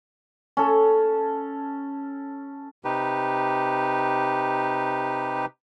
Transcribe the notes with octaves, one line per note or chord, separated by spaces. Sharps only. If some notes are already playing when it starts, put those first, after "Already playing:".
C#4 A4
C3 D#4 G4 B4